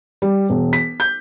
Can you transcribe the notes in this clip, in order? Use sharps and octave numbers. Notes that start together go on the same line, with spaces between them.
G3
E1
B6
G6